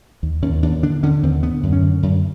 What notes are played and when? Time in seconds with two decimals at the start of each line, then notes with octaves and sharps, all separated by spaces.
0.23 D#2
0.42 D#2 C#4
0.63 D#2 D4
0.83 D3 D4
1.03 D3 C#4
1.23 D#2 C4
1.43 D3 B3
1.63 F#2
1.73 C#4
1.83 D3
2.03 F#2